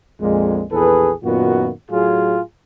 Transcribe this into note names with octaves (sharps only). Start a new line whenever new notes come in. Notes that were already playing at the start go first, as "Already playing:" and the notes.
A#1 F2 A#2 G#3
A#1 E2 G#4 A4 B4
F#2 A#2 D#3 B3 F4 F#4
A2 F#3 F4 G#4